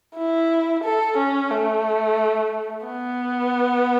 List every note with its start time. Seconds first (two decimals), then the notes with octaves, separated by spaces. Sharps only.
0.16 E4
0.83 A4
1.18 C#4
1.51 A3
2.86 B3